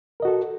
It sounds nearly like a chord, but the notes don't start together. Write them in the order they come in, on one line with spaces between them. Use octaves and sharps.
A#4 D#5 F#4 A4